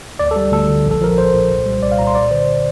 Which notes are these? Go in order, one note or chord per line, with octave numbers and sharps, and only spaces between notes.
D2 D5
A4
G3
D2 A4
D3
A#1
A4
F3 A#4
A#1 C5
A#2
C2
G3
C2 D5
F5
A#2 A#5
C6
G1 D5
D3 C5